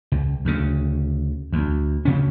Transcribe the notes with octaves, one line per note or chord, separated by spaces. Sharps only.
C#2
D2 C#3
D2
D2 C#3 C#4